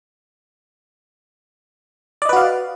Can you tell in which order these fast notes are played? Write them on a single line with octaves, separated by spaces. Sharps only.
D5 D#5 B4 F#4 F5